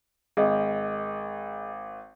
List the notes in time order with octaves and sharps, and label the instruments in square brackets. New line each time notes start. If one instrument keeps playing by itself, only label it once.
[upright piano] G#1 [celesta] G#4 D#5